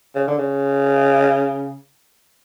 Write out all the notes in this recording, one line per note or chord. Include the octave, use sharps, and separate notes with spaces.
C#3
D3
C#3